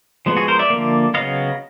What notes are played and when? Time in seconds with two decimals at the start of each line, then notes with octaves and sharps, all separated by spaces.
0.26 F3 G#3 B3
0.37 F#4 G#4
0.48 A#4 C5
0.59 D5 E5
0.70 D3 F3 A#3
1.14 C#3 F#3 B3 D#5 F5